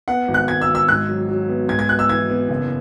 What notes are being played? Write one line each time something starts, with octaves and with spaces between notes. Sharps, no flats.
B3 F#5
G#1
F#6
G#1 G#6
E6
G#1
E6
G#2 F#6
F#3
F#3
B3
G#2 G#6
G#6
B3 F#6
E6
E3 G#6
B3
F#1